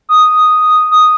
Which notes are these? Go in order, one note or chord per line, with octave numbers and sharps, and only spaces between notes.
D#6
D#6